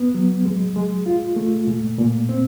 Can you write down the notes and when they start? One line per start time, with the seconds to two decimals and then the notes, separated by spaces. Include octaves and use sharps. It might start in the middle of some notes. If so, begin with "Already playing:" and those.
Already playing: B3
0.14 F#3
0.45 G#3
0.76 G#3
1.06 F4
1.36 A3
1.67 A#2
1.98 A#2
2.29 C4